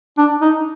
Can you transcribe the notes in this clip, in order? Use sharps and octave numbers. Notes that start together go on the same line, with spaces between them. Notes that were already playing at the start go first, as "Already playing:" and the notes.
D4
D#4